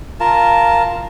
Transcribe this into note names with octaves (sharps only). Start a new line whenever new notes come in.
F4 A#4 A5